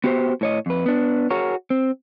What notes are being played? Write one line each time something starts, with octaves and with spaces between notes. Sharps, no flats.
B3 F#4 G4 A#4 C5
A2 C#5 D#5
F2 B4
B3 D4
F#4 G#4 A#4 C#5
C4